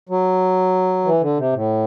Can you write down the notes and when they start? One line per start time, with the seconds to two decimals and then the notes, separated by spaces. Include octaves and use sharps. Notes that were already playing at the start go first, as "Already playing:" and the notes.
0.09 F#3
1.05 E3
1.21 D3
1.37 C3
1.53 A2